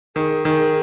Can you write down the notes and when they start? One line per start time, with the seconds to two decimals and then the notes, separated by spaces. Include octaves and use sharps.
0.16 D#3 G#4
0.45 D#3 G#4